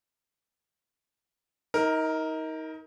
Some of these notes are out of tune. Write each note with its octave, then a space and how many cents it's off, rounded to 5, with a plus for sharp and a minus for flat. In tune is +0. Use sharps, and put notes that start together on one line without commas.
D#4 +30 A#4 +0